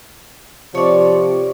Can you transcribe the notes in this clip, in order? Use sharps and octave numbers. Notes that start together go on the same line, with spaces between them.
C3 F3 C#5 D5